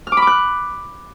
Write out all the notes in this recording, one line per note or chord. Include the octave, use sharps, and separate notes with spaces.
F6
D6
B5
D6
F#6